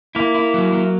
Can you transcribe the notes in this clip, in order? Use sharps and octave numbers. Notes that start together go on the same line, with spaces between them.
A#3 E4
E4
F#3
F#3